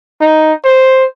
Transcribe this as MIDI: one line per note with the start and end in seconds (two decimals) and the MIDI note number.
0.21 0.53 63
0.64 1.05 72